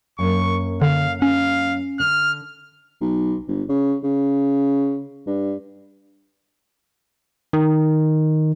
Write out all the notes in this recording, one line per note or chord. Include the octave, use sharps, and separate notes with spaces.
F#2 A#3 D4 C#6
D3 F5
C#4 F5
D3 F6
B1
G1
C#3
C#3
G2
D#3